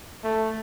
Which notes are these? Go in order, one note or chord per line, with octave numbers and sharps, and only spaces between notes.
A3